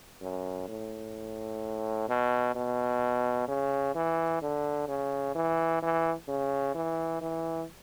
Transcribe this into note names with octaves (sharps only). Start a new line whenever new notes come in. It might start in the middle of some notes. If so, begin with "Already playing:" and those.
F#2
A2
B2
B2
C#3
E3
D3
C#3
E3
E3
C#3
E3
E3